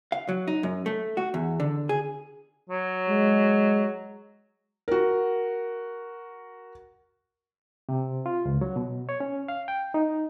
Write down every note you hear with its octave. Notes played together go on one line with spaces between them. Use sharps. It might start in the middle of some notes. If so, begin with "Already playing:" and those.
F5
F#3
D#4
F#2
A3
F#4
E2
D3
G#4
F#3
G#3
F#4 A#4
C3
F4
C#2
F#3
B2
C#5
C#4
F5
G5
D#4